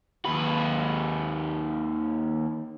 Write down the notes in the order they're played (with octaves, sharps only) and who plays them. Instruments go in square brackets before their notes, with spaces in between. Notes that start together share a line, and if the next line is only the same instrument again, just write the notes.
[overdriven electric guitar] D#2 B4